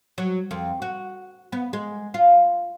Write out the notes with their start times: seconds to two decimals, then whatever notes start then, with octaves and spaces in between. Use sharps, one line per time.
0.18 F#3
0.51 F2
0.82 F#4
1.52 B3
1.73 G#3
2.14 F4